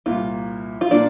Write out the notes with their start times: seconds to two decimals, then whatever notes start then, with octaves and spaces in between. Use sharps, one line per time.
0.06 C2 A#2 A#3 F4
0.81 F4
0.91 A#2 A#3 D4